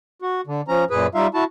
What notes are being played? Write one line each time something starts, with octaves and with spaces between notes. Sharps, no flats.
F#4
D3
F3 C#4 A#5
F#2 A#2 G#4 B4
G3 D#4 F4 E5 F5
E4 F#4 A5